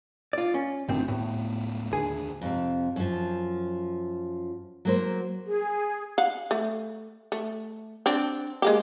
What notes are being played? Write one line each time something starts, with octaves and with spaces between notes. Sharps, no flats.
F4 D5
C#4
G1 D2 A2 D#3 C4
D1 A2 B3
D#2 D3 G#4
F2 C3
F#2 F3
F#3 A#3 C5
G#4
F5 F#5
A3
A3
C4 D4
G#3 A#3 G4